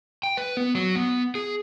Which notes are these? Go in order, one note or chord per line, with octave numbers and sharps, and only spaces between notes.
G5
B4
B3
F#3
B3
G#4